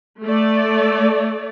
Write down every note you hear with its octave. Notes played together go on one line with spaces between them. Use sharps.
A3 D5